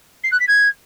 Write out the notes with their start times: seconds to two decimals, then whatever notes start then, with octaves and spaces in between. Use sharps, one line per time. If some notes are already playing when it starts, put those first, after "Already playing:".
0.23 C7
0.31 F#6
0.39 B6
0.47 G#6